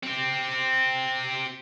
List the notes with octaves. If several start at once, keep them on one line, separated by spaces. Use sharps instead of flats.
C4 G4